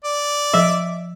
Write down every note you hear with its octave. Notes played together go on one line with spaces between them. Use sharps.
D5
F3 E5